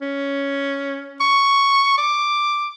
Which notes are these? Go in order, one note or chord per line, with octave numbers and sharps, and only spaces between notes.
C#4
C#6
D6